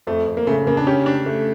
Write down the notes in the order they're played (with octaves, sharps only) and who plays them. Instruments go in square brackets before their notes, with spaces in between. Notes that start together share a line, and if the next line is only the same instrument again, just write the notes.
[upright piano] F2 [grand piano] A3
[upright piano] F2
[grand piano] A#3
[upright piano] C#3 [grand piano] A3
[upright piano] C#3 [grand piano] A#3
[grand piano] D4
[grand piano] C#4 [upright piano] G4
[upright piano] D4
A3